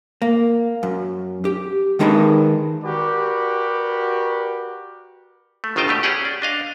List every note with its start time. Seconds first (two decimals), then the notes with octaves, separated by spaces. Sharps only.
0.22 A#3
0.83 F#2
1.45 G4
1.99 D#3 G#3 D#4 G#4 A#4 B4
2.84 F#4 G4 A#4 B4 D5
5.64 A3
5.76 G1 D#3 F4 D#5 G5 A5
5.88 B2 A3 G4
6.03 C#4 G4 G#4 F#5 G5
6.25 D5
6.42 D4 D#5 F5